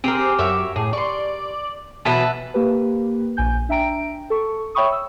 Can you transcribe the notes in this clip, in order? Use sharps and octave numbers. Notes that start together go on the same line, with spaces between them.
C4 G4 G#4 A#4
F#2 C#5 E5 D6
A2 G#4
D5 C6 C#6
B2 E3 F#3 B4 E5 F#5 A5
A#3 G4 B4
A#1 G#5 G6
D4 E5 G5 A#5 D7
A4 C#6
C#5 E5 G5 B5 C#6 D#6
E6